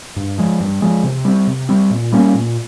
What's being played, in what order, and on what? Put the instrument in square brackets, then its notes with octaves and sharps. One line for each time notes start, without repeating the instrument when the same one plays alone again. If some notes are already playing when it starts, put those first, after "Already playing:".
[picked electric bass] G2
F3 G#3
G2
F3 G#3
C3
G3 C4
C3
G3 C4
A#2
G3 A#3 C#4
A#2